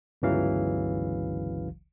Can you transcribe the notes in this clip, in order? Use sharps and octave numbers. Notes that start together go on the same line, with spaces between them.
G1 C#2 C#3 E3 F#3 F5